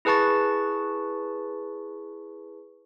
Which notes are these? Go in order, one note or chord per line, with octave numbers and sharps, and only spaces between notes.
E4 G#4 B4 A5 C#6 A6